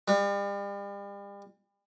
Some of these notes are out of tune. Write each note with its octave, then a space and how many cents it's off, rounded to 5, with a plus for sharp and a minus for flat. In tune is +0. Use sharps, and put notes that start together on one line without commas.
G3 +40